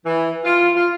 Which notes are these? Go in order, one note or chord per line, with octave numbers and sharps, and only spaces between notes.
E3
F4
F4